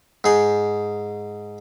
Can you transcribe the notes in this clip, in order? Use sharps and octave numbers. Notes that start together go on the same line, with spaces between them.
G#2 G#4